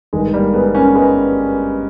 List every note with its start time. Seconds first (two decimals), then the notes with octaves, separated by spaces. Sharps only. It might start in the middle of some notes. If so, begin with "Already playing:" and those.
0.13 G#1 G2 D#3 G#3
0.34 G3 A#3
0.54 G#3 B3
0.75 A#3 C#4
0.95 G#3 B3